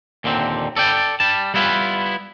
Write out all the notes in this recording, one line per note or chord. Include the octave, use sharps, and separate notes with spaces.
D#2 A#2 D3 C4
A4 D5 G5
G3 A5
G3 B3 E4 F4 B4